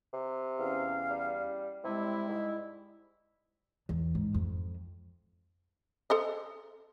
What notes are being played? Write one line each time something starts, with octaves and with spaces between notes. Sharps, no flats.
C3
E2 C#4 F5
G3
C3 G3 G#3 E4
G#2
E2
G#2
F2
A4 C5 D#5